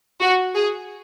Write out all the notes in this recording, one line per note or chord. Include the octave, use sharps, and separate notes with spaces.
F#4
G#4